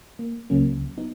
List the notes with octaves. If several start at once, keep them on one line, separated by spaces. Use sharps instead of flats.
A#3
C#2 C#3 F#3 A#3 C#4
B3 D#4